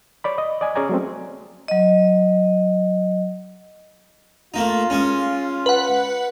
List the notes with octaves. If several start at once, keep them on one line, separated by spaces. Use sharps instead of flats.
C#5 D5 B5
D#5
D5 D#5 G#5
C#4 G#4 C#5 D5 G#5 A#5
F#3 A3 C4
F#3 D#5
A3 A#3 D#4 F4
G#3 C#4
B4 F#5